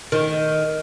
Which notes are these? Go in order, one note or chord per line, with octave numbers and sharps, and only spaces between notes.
D#3